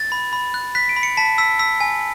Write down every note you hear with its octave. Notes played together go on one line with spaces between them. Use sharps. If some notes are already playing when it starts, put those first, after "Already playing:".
Already playing: A6
B5
B5
F#6
F#6 B6
D7
B5
C#7
A5 B6
E6 B6
E6 B6
G#5